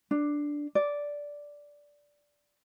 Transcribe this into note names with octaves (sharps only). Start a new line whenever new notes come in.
D4
D5